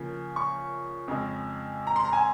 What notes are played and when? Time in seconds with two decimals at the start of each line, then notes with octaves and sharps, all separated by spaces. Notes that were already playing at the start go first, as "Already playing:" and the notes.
Already playing: C#3 F3 A#3
0.36 C#6
1.08 F2 C#3 G#3
1.87 A#5
1.96 C6
2.05 A#5
2.13 G#5